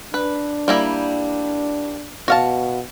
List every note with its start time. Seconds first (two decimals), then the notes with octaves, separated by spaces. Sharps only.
0.14 D4 B4
0.68 G3 A#3 E4
2.28 B2 F#4 F5 A5